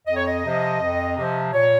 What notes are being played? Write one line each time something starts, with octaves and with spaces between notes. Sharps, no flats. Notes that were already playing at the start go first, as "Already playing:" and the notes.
F2 D#5
C#5
D#5
C3 F3
F2
C3 F3
A#2 C#5